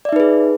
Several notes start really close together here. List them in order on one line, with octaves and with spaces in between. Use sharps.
D5 E5 D#4 B4 G#4